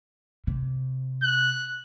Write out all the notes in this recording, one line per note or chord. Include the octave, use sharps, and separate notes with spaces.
C3
F#6